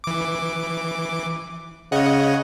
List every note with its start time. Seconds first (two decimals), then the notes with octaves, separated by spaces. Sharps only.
0.04 E3 D6
1.92 C#3 C#5 D#5 F#5